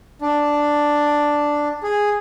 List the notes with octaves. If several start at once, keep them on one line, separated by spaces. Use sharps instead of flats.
D4
G#4